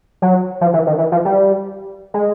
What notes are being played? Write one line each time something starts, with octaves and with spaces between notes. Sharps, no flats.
F#3
F3
E3
D#3
E3
F3
G3
G#3